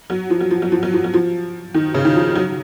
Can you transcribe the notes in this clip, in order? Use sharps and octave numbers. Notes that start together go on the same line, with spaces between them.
F#3
F3
F#3
F3
F#3
F3
F#3
F3
F#3
F3
D#3
C#3
D#3
F3
F#3